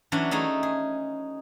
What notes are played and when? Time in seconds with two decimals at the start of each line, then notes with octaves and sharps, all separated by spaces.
0.12 E3 F#3 C#4 D4
0.31 A3 D#4 G#4
0.63 G#4